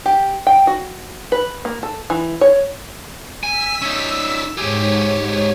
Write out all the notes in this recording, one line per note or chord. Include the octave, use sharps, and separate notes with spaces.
G4
G5
F#4
B4
A#3
A4
E3
C#5
G#5 E6 B6
C#4 D#4
G#2 G4 G#4 C#5